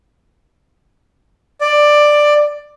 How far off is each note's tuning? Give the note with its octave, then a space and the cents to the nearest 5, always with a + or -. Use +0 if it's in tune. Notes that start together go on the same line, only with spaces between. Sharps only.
D5 +10